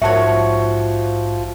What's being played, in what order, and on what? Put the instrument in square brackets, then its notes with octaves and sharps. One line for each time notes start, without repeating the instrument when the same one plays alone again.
[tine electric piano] A#1 G#2 C#7 [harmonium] F3 [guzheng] F#4 C#5 [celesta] E5 A5